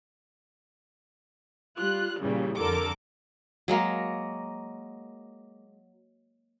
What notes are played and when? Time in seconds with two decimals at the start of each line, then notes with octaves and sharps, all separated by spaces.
1.78 G3 F4 F#6
2.20 A#2 C#3 E3 G3
2.57 F2 D3 A4 A#4 D6
3.68 F#3 G#3 A#3 A#4